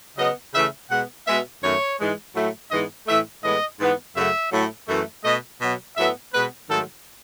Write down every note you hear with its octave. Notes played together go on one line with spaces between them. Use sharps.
C#3 F#3 B3 D#5
C#3 E3 A3 E5
B2 G#3 B3 F#5
B2 G#3 B3 E5
F#2 D#3 A3 C#5
G#2 E3 G#3
A2 F#3 A3
G#2 E3 G#3 B3 D#5
A2 E3 A3 E5
A2 E3 G#3 B3 D#5
G#2 E3 B3
F#2 C#3 F#3 A3 E5
A2 F#3 A3
F#2 E3 A3
B2 A3 D#5
B2 F#3 B3
A2 F#3 B3 E5
B2 G#3 B3 B4
G#2 D#3 F#3 A3 A4